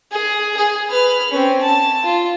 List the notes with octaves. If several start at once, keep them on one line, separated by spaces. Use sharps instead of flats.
G#4
G#4
B4 F6
C4 C#4
A5
F4